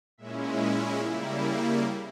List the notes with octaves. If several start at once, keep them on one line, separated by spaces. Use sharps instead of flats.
A#2 G#3 C#4 E4 E5
E5
C#3 G3 A#3 E4 E5